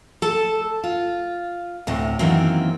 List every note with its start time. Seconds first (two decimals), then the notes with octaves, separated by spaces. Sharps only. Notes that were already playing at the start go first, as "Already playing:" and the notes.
0.22 A4 A5
0.84 F4
1.87 D2 A2 C3
2.19 F#2 D#3 E3 F#3 A#3 C4